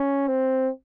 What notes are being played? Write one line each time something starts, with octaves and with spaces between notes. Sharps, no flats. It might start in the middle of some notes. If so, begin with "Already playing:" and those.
Already playing: C#4
C4